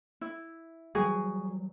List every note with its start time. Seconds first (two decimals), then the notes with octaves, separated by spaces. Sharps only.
0.21 E4
0.95 E3 F#3 G3 F#4 G#4 G#5